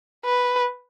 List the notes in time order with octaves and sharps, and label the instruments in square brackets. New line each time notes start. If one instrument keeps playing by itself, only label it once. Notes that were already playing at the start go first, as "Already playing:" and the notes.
[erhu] B4